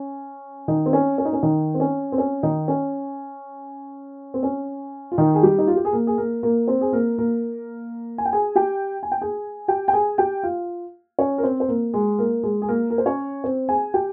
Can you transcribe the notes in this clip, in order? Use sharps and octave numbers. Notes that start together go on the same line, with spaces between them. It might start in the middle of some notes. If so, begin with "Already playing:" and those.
Already playing: C#4
D#3 D#4
C4
C#4
C#4
D#4
C#4
D#3 D#4
C4
C#4
C4
C#4
D#3 D#4
C#4
C4
C#4
F4
D#3 D#4
G#4
G3 G4
D#4
F4
G4
G#4
A#3 A#4
G#4
A#3 A#4
A#3 A#4
C4 C5
G#4
A#3 A#4
A#3 A#4
G#5
G5
G#4 G#5
G4 G5
G#5
G5
G#4 G#5
G4 G5
G5
G#4 G#5
G4 G5
F4 F5
C#4 C#5
A#4
C4 C5
C5
A#3 A#4
G#3 G#4
A#3 A#4
G#3 G#4
G#4
A#3 A#4
A#4
C5
C#4 C#5
C4 C5
G#4 G#5
G4 G5